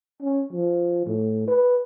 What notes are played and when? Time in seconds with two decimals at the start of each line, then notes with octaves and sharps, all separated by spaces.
0.22 C#4
0.53 F3
1.06 A2
1.48 B4